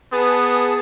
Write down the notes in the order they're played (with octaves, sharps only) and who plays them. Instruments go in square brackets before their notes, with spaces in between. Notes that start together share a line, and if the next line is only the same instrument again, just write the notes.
[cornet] B3 [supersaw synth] G#4 A5 [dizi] B4 [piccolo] D#6